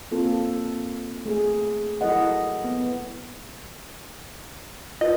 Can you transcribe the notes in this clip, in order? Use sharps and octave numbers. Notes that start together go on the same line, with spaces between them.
A#3 C4 F4 A4
A3 G#4
F#3 E4 A4 A#4 D#5 F#5
B3
F4 A#4 B4 D#5